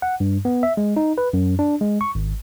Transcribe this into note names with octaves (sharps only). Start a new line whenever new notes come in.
F#5
G2
B3
E5
G#3
D#4
B4
F#2
D4
G#3
C#6
G#1